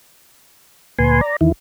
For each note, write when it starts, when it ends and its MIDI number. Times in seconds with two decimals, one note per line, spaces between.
0.99 1.21 38
0.99 1.21 46
0.99 1.21 71
0.99 1.21 80
0.99 1.21 84
1.21 1.36 74
1.21 1.36 82
1.41 1.52 40
1.41 1.52 51
1.41 1.52 52
1.41 1.52 64